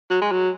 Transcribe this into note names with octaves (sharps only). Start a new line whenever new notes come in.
F#3
G#3
F#3